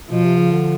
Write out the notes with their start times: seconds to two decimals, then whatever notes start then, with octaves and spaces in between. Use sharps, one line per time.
0.10 B2 F3
0.24 C3
0.37 C#3
0.52 D3